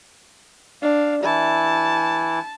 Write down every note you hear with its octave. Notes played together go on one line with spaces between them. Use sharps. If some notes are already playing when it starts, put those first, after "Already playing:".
D4 F5
E3 E4 A5